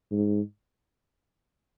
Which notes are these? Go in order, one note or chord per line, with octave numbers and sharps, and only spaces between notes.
G#2